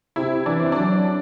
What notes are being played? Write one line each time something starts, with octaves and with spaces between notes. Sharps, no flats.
C3 E4
E3 D4
C4
F#3 D4